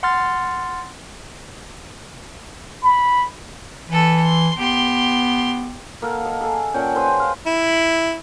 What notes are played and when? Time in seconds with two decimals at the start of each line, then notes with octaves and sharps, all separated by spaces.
0.03 F#5 C6 F6 A6
2.85 B5
3.88 E3 A4 B4
4.22 C6
4.58 B3 G4 C6
6.02 A#3 A4 F5 F#5
6.25 D#5
6.41 G#4 A4
6.74 A#2 C#4 F#5 G5
6.95 G#4 B4 C5 G5
7.20 F5 F#5
7.47 E4